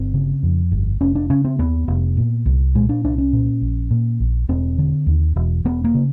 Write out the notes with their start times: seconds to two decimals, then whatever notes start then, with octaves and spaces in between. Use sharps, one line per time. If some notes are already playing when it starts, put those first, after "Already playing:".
Already playing: G1 C4
0.14 C#3
0.43 F2
0.72 G1
1.01 F1 C#4
1.15 D4
1.30 C#3 C#4
1.44 C4
1.59 D#2 B3
1.88 F1
2.17 A#2
2.46 C2
2.75 A#2 G#3
2.89 D4
3.04 C2 D4
3.18 C#4
3.33 A#2
3.61 A#1
3.91 A#2
4.20 A#1
4.49 E1 C4
4.78 D3
5.06 D#2
5.36 E1
5.65 E1 B3
5.84 A#3
5.95 C#3